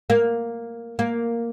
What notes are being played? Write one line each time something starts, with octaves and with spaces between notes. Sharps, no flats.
A#3
A#3